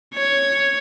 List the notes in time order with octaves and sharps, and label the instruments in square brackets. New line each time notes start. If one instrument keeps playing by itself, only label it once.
[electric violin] C#5